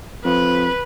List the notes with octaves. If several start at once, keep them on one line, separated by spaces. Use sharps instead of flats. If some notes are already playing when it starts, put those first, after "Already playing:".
F2 B4